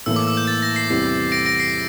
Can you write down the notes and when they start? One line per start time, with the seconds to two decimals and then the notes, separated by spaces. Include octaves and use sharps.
0.06 A2 E3 A#3 E6
0.16 D6
0.27 E6
0.37 G6
0.47 A6
0.63 A#6
0.76 C7
0.90 E2 C3 E3 G3 C7
1.32 A#6 D7
1.46 A#6 D7
1.60 C7